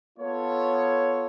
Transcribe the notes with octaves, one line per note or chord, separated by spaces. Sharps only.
B3 F4 A4 C#5